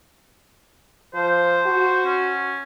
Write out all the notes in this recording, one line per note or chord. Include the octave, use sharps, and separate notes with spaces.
F3 C5
F#4
C#4